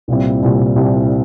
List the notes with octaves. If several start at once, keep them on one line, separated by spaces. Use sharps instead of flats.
C2 A#2 G3 C4 E4
C2 A#2 G3 C4 E4
C2 A#2 G3 C4 E4